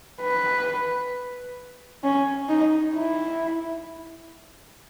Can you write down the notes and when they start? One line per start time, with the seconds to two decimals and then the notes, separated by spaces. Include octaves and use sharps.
0.22 B4
2.04 C#4
2.49 D#4
2.95 E4